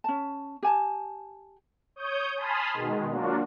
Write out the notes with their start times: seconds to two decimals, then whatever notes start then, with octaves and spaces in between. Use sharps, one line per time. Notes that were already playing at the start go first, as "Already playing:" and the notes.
0.04 C#4 A5
0.63 G4 G#5 A5
1.96 C#5 D#6 G6
2.36 G#5 A5 B5 C6 D#6 F6
2.74 B2 D#3 G#3
3.09 F#3 A#3 D4 F4 F#4